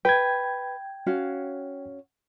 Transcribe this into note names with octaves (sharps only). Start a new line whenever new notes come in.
B4 G5 G#6
C#4 F#4 F5